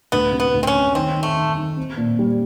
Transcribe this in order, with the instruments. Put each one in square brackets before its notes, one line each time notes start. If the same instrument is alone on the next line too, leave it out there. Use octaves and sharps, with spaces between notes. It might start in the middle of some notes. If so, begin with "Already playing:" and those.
[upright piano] D2 [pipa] B3
[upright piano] C3
[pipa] B3
[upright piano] D2
[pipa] C4
C#4
[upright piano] C3
[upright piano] D#3 [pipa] C4
[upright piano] D#3
[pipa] A3
[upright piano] D#3
D#3
C4
A#2
G3